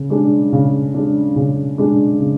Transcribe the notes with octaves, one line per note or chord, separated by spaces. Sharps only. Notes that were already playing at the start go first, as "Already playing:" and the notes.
Already playing: C#3
G#3 D4
C#3
G#3 D4
C#3
G#3 D4
C#3